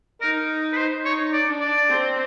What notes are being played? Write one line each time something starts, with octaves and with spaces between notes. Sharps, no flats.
D#4 A#4
B4
C5
D#4 C#5
D5
D4
D5
C4